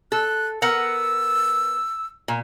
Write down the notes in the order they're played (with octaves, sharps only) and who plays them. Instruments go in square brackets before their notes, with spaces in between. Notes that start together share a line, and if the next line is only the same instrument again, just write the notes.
[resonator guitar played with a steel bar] A4 [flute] F#6
[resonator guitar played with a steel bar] B3 A#4 F#5 [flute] E6
[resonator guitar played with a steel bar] A#2